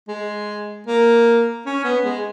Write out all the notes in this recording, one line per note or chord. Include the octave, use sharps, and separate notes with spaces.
G#3
A#3
C#4
B3
G#3